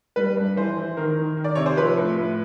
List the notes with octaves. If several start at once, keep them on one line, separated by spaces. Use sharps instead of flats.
G3 B4
G2
E3 C5
E3
D#3 A#4
D#3
D#3
D5
C3 C#5
C5
F3 B4
A2
A2